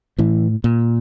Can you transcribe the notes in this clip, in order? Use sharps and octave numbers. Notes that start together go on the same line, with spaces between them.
A2 E3
A#2